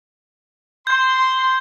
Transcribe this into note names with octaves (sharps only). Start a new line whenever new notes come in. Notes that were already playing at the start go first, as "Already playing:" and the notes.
C6 G6